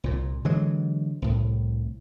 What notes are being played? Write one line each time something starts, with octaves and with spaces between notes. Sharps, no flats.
C2 A#2
D3 E3 F#3 G#3
C2 A2